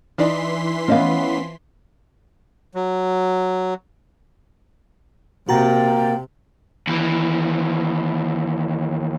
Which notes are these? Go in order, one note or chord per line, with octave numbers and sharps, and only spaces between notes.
E3 D4 D#4 D5 C6 B6
F3 B3 C#4 D#5 F5
F#3
C3 A#3 F#4 G5 A#5 A6
D#2 E3